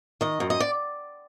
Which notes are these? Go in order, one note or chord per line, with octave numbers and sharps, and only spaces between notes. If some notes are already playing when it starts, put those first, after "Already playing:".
D#3 D#5
F#2
D#5
D5